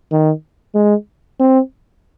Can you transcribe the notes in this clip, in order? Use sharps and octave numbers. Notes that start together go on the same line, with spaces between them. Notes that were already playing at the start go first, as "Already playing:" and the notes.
D#3
G#3
C4